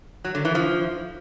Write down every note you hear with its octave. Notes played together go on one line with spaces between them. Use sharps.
F#3
D3
E3
F3